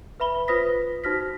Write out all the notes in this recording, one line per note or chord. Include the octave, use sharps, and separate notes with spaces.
B4 E5 B5 G7
F4 B4 C5 D#6 A#6 B6
D#4 F#4 C5 F6 A#6 B6